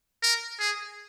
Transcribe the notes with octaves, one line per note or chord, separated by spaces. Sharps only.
A#4
G#4